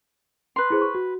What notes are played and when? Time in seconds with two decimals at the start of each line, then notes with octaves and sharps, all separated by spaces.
0.56 B4 C6
0.70 E4 G#4 C5
0.82 C#6
0.95 F#4